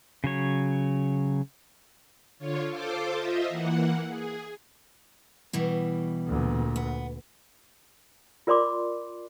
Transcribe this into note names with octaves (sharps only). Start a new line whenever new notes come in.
C#3 F#3 C#5
D3 F4 C#5
F4 A4 C5 C6 D6
F4 C5 D#5 E5
E3 A#3 F#5
G#4
B2 E3 G3
D2 A#2
B3
F4 A#4 D5 B5 C6 D6